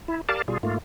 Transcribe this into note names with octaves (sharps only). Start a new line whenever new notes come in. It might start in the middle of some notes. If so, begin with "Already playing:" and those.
E4
G4 A#4 D5 F5 A5
B2 G3 F4 G#4
G#2 A3 A#3 F4